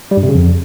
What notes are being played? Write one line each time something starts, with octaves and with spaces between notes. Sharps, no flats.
G3
G2
C3
C#3
F2